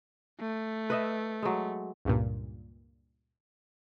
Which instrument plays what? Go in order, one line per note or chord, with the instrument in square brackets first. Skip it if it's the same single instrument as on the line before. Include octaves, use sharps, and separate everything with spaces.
[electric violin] A3
[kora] B4 D#5 E5
F#3 G#3
[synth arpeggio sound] C#2 G2 A#2